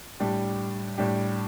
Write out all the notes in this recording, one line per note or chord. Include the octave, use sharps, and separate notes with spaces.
A2 G3 D4 G4
A2 G3 D4 G4